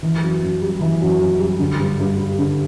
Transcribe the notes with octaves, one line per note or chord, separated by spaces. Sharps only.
E3
F#2
F#2
G3
E3
F#2
F#2
G3
D3
G2
G2
G3
D3